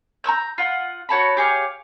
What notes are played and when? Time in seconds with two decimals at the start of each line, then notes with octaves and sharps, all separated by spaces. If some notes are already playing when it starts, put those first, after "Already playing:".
0.24 A#5 C#6 E6 G6
0.58 F4 F#5
1.09 F#4 C#5 A5 B5
1.37 G4 G#4 C#5 F5